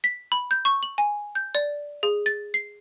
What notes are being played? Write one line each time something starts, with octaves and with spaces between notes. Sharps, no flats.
B6
B5
G6
C#6
F#7
G#5
G6
D5
G#4
A6
C7